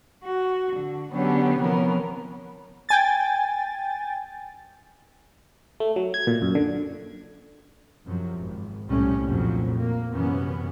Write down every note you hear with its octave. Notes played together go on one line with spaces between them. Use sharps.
F#4
D3
D3 F#3 B3 C#4 G4
C3 E3 F3 B3 C#4 A#4
G5 G#5 A6
A3
F#3
G#6
A#2
F#2
D3
F#2 C3 F3 F#3
G#1
C2 A2 G3 C#4
A#1 F2 A2 F3 F#3
A#3
F#2 C3 E3 B3 C#4